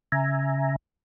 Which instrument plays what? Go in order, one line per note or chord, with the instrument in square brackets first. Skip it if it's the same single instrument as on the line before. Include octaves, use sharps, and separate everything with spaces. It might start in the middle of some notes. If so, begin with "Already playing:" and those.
[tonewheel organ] C#3 E5 G#5 A#5